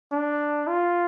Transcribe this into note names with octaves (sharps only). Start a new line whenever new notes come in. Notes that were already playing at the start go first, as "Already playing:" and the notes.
D4
F4